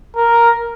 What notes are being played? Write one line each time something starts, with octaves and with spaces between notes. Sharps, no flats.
A#4